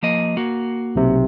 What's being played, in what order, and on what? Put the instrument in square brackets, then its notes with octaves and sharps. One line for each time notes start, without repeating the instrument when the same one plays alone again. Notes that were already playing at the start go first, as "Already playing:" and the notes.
[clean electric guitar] F3 A#3 D#5
A#3 F#4
[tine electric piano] B1 C3